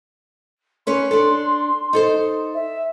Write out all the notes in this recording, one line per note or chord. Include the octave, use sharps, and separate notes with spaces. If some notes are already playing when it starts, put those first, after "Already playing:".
C#4 B4 C#5 C6
D4 A4
D#4 A4 C5
E5